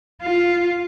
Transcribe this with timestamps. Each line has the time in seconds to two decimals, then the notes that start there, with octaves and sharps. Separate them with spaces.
0.22 F4